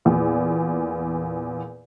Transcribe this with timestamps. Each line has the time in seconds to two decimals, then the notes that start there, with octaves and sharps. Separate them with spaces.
0.05 E2 A#2